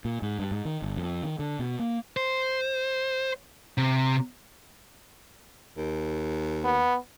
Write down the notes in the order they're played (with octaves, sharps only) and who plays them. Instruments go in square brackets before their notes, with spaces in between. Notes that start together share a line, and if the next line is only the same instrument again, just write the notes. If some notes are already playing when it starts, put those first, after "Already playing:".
[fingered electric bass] A#2
G#2
G2
G#2
D#3
G1
F2
D#3
D3
B2
A#3
[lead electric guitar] C5
C3
[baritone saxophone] D#2
[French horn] B3